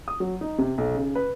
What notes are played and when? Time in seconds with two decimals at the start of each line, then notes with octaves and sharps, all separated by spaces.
0.08 D#6
0.20 F#3
0.41 D#4
0.58 C3
0.78 B1
0.95 C#3
1.15 B4